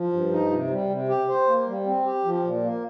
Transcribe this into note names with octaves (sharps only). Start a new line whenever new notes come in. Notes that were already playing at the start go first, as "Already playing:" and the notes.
Already playing: F3
G2
D#4
C3
G3
C3
G4
C5
A#3
G3
C4
G4
F3
A#2
A#3